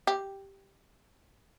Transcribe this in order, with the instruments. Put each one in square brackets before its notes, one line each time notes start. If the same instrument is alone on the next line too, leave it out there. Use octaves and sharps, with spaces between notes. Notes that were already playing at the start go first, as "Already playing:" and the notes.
[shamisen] G4